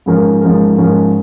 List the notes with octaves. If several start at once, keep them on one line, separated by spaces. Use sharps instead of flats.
G#2 F3 C#4 A#4
G#2 F3 C#4 A#4
G#2 F3 C#4 A#4